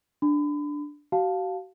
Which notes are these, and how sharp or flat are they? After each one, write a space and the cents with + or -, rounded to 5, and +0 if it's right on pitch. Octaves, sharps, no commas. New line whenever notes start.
D4 +0 B5 +35
F#4 +40 F5 +10 A5 +0